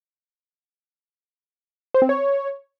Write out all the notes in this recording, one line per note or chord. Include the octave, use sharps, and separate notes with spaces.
C5
C4
C#5